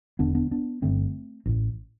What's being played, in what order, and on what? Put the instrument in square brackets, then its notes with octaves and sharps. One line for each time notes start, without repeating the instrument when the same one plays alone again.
[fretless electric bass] E1 E2 D3 B3 D4
B3 D4
B3 D4
G1 G2 D3 A3 C4
A1 A2